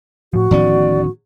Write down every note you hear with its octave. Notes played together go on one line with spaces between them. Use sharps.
A2 F3 F#4
D1 A2 D#3 F3 B3 C#4 D5